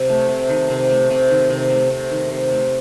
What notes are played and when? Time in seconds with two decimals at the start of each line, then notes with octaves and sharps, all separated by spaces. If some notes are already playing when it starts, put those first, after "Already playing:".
Already playing: C3
0.09 A3
0.29 C3
0.50 D#3
0.70 C3
0.90 A3
1.10 C3
1.31 D#3
1.50 C3
1.70 A3
1.91 C3
2.11 D#3
2.31 C3
2.51 A3